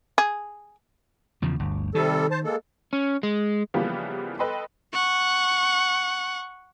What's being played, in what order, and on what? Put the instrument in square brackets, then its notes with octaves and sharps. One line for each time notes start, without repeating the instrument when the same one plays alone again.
[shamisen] G#4
[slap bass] E2 C#3 F3
G1 D2
[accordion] C3 G3 A4 [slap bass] D#3
[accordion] C5 A5
G#3 A#3 A4
[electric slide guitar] C#4
G#3
[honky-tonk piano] C#3 E3 F3 G3 A#3 B3
A4 B4 D#5 G5 C6
[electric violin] F#5 C#6